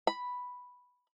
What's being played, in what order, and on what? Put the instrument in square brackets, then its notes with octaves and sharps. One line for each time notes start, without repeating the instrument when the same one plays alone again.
[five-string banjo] B5